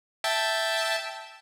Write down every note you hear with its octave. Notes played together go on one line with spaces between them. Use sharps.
E5 G5 A5